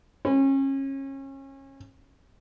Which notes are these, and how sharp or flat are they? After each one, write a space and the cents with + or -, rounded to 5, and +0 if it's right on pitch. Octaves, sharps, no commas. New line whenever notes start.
C#4 -30